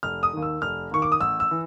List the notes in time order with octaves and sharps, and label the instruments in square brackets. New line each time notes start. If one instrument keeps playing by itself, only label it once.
[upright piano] F1 F6
D#6
D#2 D#3
E6
F1 F6
D#2 D#3 C#6
D6
D#6
A1 E6
E6
E3